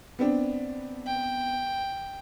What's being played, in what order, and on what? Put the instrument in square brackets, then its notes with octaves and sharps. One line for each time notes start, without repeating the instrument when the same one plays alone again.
[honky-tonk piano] B3 C4 D4
[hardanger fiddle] G5